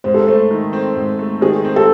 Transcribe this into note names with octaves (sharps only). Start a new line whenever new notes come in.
G#2 C5
A4
A3 C5
D#3
C4
G#2
A3
D#3 G#4
C4
A4